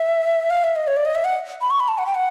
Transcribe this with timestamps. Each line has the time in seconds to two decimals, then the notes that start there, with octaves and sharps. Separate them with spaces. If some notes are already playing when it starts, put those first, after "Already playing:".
Already playing: E5
0.50 F5
0.64 E5
0.76 D#5
0.87 C#5
0.96 D5
1.05 D#5
1.15 E5
1.25 F#5
1.61 B5
1.70 C#6
1.80 B5
1.88 A5
1.98 F#5
2.06 G5
2.15 F#5